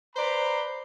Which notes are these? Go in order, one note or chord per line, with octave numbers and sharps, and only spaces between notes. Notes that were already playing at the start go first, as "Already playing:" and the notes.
B4 C5 D5 A#5 B5